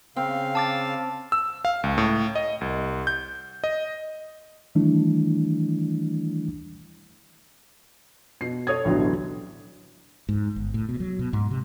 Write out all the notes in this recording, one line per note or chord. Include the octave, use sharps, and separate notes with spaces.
C#3 C4 F5
A5 D6 A6
E6
F5
C#2
A2
D#5
C2
G6
D#5
D#3 E3 G3 A3 D4 E4
B2 C7
A4 C#5 D#6 G#6
A1 D2 B2 D3 E3 F#3
G#2
G1
A2
B2
F#3
B2
G#2
C3